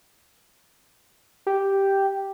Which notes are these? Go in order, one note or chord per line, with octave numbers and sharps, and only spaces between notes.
G4